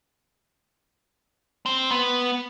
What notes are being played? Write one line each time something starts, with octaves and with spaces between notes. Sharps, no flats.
C4
B3